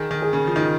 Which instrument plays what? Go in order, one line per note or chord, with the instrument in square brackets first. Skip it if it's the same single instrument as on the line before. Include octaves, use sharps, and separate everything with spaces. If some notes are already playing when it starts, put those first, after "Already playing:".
Already playing: [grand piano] D#3 [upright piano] G#4
[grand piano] D#3
[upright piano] G#4
[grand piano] C#3
F3
[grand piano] D#3 [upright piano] D#4